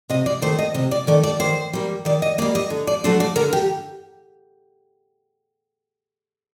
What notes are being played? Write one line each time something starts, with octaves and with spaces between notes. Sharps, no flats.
C3 D#5
D5
D#3 A3 C5
D#5
C3 D#5
D5
D#3 A3 D5
D5
D#3 C5
G3 A#3
D#3 D5
D#5
G3 A#3 D5
D#5
D3
D5
F#3 A3 D4 C5
D5
D3 A#4
G4